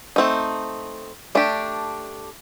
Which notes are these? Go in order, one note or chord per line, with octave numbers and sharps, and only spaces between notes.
A3 C4 D#4
A3 D4 G4